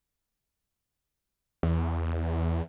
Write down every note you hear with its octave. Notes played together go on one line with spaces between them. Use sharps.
E2